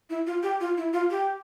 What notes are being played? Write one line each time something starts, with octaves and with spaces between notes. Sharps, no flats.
E4
F4
G4
F4
E4
F4
G4